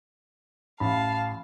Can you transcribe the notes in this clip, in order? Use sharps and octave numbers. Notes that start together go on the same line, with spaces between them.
A1 F5 A5 B5